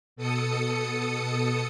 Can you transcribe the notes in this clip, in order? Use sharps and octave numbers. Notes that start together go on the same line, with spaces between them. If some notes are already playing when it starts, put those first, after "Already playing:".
B2 A4 D#6 C#7